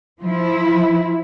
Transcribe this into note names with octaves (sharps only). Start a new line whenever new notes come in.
F3 E4